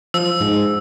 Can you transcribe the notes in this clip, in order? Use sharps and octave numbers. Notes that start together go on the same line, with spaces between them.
F3 E6
G#2